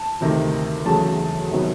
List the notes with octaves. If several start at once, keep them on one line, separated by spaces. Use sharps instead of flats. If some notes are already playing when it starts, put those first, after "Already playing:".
Already playing: A5
D2 C3 D#3
E1 E2 C#3 F#3 A3 A5
C3 D#3 F#3 B3